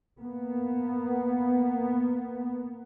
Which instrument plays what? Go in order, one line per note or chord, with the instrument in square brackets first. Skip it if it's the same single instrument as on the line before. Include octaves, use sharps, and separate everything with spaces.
[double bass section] A#3 B3